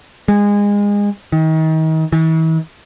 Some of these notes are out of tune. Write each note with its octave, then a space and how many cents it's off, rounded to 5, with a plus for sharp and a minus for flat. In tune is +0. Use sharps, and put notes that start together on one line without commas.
G#3 -25
D#3 +35
E3 -45